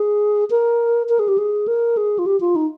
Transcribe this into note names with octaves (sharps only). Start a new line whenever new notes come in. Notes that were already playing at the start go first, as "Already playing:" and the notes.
Already playing: G#4
A#4
A#4
G#4
G4
G#4
A#4
G#4
F4
G4
F4
D#4